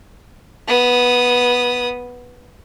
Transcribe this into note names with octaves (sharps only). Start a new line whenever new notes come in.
B3 D#6